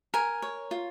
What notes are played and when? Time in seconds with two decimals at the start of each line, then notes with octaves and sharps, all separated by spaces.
0.14 A#4 G#5
0.42 C#5
0.71 F4